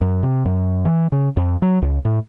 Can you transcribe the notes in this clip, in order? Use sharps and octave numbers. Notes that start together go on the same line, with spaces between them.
F#2
C3
F#2
E3
C#3
F2
F#3
C#2
A2